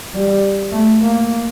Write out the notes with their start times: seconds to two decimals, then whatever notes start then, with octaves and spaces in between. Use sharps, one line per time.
0.14 G3
0.72 A3
1.01 A#3